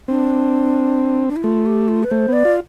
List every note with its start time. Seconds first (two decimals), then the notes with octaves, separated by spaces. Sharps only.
0.08 C4 D4
1.29 D4
1.36 E4
1.43 A3 F4
1.66 G4
1.88 F4
2.03 B4
2.11 A3 C5
2.28 B3 D5
2.45 F4